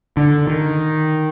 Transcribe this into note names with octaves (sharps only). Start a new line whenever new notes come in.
D3
D#3